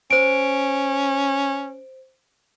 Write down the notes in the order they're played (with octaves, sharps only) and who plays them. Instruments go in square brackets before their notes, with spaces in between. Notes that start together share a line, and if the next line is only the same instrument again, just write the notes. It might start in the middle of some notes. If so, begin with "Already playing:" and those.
[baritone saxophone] C#4 [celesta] C5 D7